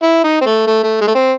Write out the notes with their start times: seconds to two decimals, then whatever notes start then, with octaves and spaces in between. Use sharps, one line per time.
0.03 E4
0.24 D#4
0.41 C4
0.46 A3
0.67 A3
0.83 A3
1.01 G#3
1.07 A3
1.15 C4